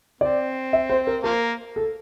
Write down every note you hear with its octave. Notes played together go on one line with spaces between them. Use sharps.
C4 D5
E5
C5
A#4
F3 A#3 A#4
A4